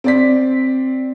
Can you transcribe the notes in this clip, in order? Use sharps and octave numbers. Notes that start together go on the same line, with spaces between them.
C4 D5 B6